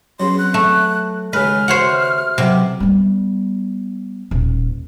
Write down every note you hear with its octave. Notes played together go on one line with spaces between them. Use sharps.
F#3 B3 C#4 G#4 C6
C4 F#6
A3 A5
D#2 C#3 G#3 B4 C#5 G#5 F6
F#4 C5 C#5 E5 F#5
B1 C3 F#3 B4 G5 D6
G3 B3
D#1